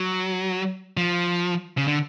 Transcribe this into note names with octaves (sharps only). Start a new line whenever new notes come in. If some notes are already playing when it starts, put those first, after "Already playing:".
Already playing: F#3
F3
C#3
D3